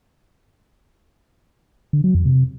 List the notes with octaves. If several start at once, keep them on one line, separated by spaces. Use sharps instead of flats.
D3
F#3
F2
C3